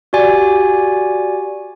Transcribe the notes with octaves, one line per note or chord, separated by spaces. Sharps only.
F#4 G4 D5 G#5